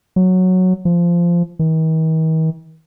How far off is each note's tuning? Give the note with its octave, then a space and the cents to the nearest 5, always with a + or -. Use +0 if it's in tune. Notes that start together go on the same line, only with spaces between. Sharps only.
F#3 -5
F3 -15
D#3 +45